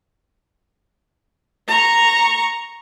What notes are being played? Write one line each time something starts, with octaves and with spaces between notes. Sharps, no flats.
A#5 C#6